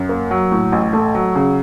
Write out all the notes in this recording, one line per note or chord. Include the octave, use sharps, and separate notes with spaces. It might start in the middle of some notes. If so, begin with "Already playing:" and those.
Already playing: F#2
A#3
F#3
A2
A1
A3
F#3
C#3